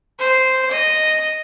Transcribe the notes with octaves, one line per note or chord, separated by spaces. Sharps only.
C5
D#5